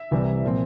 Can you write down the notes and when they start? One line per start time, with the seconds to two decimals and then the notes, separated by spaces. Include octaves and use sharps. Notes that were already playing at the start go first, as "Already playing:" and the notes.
Already playing: E5
0.11 C2 C3 E3 G3
0.45 A#2 F3 C4